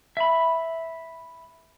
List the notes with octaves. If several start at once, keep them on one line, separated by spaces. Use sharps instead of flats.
E5 B5